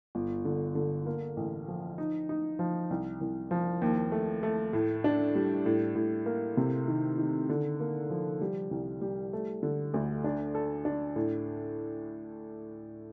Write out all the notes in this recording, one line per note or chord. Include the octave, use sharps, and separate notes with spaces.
G1
D3
D3
A#3
A1
F3
D#4
D#4
F3
C2
C2
F3
D#2
A3
A3
A2
D4
G3
A2
A2
A#3
C3
D#3
D#3
D3
A#3
F3
G3
C2
G3
A3
D3
D2
D4
A4
D4
A2